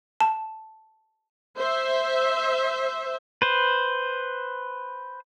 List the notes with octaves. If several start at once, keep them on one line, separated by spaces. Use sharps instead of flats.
A5
C5 E5
B4 C5